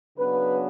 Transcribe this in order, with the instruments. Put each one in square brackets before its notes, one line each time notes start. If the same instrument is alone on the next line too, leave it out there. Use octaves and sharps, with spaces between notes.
[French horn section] C#3 F#3 B3 D4 B4